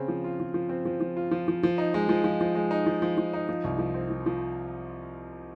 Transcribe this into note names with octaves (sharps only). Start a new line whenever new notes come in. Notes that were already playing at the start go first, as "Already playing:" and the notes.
Already playing: C#3 C4
F3
F4
F3
F3
C4
F3
F3
F4
F3
F3
F3
D#4
G#3
F3
F3
F3
G#3
D#4
F3
F3
F3
D#4
F3
C2
F3
C4
F3
F3